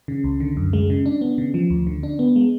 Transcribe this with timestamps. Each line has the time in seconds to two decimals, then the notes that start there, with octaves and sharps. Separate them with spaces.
0.08 C#3
0.24 C#2
0.40 D3
0.57 F#2
0.73 G#3
0.90 C#3
1.06 D4
1.21 B3
1.38 C#3
1.54 F3
1.70 D2
1.87 D3
2.03 D4
2.19 B3
2.36 G#3